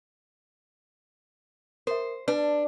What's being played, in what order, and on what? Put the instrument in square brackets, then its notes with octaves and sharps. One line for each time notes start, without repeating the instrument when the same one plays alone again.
[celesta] A#4 E5 [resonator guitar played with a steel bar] C5
[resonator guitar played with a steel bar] D4 [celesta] B4